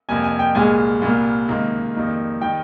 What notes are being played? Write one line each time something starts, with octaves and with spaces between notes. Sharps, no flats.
F2 C3 G3 A#3 G#5
G#5
G5
C2 A#2 G#3 G#5
C2 A#2 G3 A#3
C#2 C3 D#3 A#3
F2 D#3 G3 A#3
D#3 G3 G5